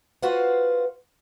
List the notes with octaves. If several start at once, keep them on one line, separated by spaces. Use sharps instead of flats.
F4 F#4 B4 C5 F5 F#5